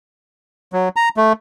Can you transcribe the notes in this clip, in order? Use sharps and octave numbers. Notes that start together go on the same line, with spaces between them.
F#3
A#5
A3